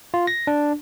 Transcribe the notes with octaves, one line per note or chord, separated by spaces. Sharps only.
F4
A#6
D4